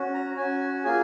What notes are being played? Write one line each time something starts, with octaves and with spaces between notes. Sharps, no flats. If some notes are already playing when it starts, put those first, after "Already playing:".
Already playing: C#4 F#4
A#5
C#4 F#4 G#5
A#3 F4 G#4 G#5